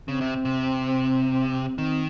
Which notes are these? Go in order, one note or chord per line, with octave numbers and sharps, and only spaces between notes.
C#3 C4
C3
C3
D#3 C4